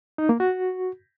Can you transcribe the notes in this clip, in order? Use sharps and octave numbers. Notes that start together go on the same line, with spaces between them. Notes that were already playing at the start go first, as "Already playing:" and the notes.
D#4
A#3
F#4